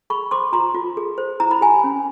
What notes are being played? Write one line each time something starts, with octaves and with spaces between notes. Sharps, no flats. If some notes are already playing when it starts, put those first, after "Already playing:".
G#4 B5 C#6
C5 C6 D6
F4 A#5 C6
F4
G#4
C5
E4 A#5
B5
G4 G#5 A#5
C#4